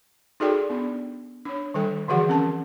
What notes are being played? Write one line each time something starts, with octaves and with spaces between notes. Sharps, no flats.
D#4 F#4 G#4 A4 D5 G5
B3 D4
D4 C#5
D#3 G3 A4 G5
D3 E3 F3 F#4 G#4 F#5
C4 C#4 A#4 A5